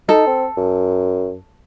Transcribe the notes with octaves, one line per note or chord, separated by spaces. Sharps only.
D#4 A4
C4
F#2